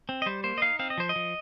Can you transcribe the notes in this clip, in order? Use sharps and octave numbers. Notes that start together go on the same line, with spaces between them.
C4
D#5
G3 C5
A#3 C5
D#5
D#4 F5
C4 F5
D#5
F3 C5
D#5
F3